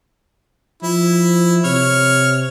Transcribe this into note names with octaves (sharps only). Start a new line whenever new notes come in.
F3 E4
C3 C#5 F6